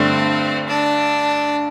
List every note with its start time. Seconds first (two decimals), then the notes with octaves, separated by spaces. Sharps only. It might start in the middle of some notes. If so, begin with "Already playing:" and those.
Already playing: G2 D3 A3 C4
0.68 D4